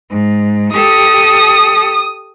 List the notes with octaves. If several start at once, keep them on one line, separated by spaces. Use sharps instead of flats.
G#2
G4 A4 D#6